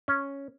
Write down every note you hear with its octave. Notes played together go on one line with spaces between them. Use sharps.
C#4